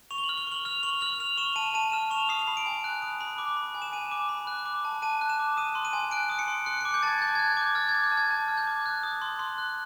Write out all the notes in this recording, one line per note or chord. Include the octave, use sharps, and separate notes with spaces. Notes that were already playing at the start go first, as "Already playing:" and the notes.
C#6 F7
G7
F#7
F6
G7
C#6 F#7
F6 F7
C#6 F#7
F6 F#7
F6 F7
C#6 E7
A5 D#7
A5 D#7
F6 E7
C#6 F7
D#6 C7
B5
D7
G#5
F#6
D#6
B5
D6
B5
G#5
E7
G#5 D#7
D6
B5
F#6
D6
A5
A5 D#7
F#6
E7
D6
D#6 D#7
C6
D#7
G#5
F#6 D7
D#6 D7
C#7
C6
F#6 C#7
D6 C#7
G6
A5 G#6 A6
A5 G6
G#6
F#6
G#6
D6
G6
F6 A6
G#6
D6
G6
A5
G#6
A5 G#6
F6
G6
D6
F#6
D#6
C6
C6
F#6